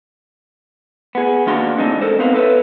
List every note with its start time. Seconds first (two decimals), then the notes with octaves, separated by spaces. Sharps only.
1.15 B3 G#4
1.47 D#3 A#3 D4 F#4 F5 C6
1.78 D3 E3 G#3 C4 D4 D#4
2.01 A4 A#4 C5
2.19 B3 C4 D#4 B4 F5
2.34 A4 B4 C#5 E5